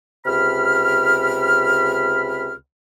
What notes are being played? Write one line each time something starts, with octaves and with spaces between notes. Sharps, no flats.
C#2 C3 B5 F6